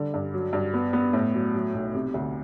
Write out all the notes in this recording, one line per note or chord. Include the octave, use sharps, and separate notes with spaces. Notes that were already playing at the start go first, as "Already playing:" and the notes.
Already playing: D3 G3
G2
F#3
G2
B3
B3
A2
F#3
F#3
B1
C3
D2